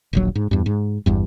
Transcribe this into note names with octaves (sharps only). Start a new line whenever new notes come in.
D#1 A#1 F#3
G#2
E2 G2
G#2
G1 E2 G2